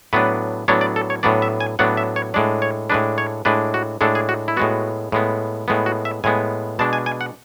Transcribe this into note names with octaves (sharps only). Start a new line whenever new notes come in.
A2 F#3 B3 D4 B4
A2 F#3 B3 D4 C#5
D5
A4
C#5
A2 F#3 B3 D4 D5
E5
G#5
A2 F#3 B3 D4 F#5
E5
C#5
A2 G#3 D4 D5
C#5
A2 G#3 D4 B4
C#5
A2 G#3 D4 B4
F#4
A2 G#3 D4 A4
G#4
F#4
E4
A2 G#3 B3 F#4
A2 G#3 B3
A2 G#3 B3
F#4
E5
A2 G#3 B3 G#5
B2 G#3 D4 A5
G#5
G#5
F#5